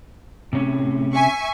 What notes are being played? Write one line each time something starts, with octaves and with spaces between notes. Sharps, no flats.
A2 C3 C#4
E5 G#5 C#6